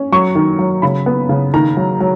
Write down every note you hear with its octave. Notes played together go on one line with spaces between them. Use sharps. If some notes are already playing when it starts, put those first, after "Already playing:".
Already playing: C#4
F#3 C#6
D#3
F#3
C#3 B5
B3
C#3
D#3 A#5
F#3
F#3